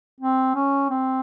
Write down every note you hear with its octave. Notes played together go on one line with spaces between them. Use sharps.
C4
C#4
C4